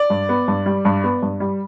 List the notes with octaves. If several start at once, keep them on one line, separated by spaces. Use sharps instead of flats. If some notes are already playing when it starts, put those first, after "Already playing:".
Already playing: D5
G2
B3
G2
G3
G2
B3
G2
G3